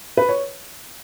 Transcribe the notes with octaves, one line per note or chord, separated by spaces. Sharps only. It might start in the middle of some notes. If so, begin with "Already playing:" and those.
B4
C#5